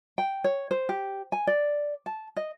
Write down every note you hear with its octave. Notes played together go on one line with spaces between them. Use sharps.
G5
C#5
C5
G4
G#5
D5
A5
D#5